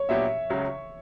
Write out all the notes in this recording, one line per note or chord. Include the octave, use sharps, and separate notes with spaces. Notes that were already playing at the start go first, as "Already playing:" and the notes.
Already playing: C#5
A#2 F#3 B3 D4 G4 E5
C#2 C#3 F#3 C#4